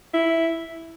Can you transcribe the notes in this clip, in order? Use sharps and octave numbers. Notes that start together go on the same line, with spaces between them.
E4